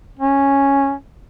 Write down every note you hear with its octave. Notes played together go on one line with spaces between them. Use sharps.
C#4